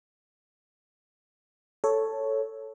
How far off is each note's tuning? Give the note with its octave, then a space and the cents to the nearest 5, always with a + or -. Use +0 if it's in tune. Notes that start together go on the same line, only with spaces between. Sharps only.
A4 +0 C#5 +0